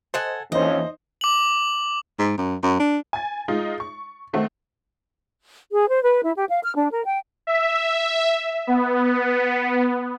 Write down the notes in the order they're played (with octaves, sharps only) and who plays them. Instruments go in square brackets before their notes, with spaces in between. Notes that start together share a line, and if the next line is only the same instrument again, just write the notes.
[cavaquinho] A4 F#5 G#5 [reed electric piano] C5 D#5
[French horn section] F2 C#4 [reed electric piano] E3 A#3 E5 [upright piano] D#4 C5 [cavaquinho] D#5
[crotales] D6 F#7
[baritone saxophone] G#2
F#2
F#2
D4
[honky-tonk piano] G#5 A6
G#3 D#4 F4
C#6
D#3 A3 C4 F#4
[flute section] G#4
C5
B4
E4
G4
F5
F6
D4
A#4
G5
[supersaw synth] E5
B3